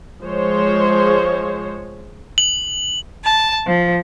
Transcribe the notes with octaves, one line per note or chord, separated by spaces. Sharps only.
F3 G#3 C5 C#5
F#7
A5
F3